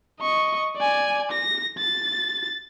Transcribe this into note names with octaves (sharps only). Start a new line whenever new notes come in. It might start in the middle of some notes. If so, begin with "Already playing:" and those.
D#5 C#6
D5 G#5
A#6
A6